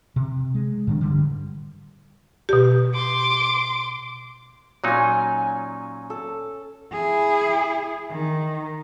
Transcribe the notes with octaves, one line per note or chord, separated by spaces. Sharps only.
C3
G#3
A2 D#3 D4
G2 D3 G3
B2 G4
C6 D6
A#2 F#3 C#4 D#4 G#5
A4
E4 G#4
D#3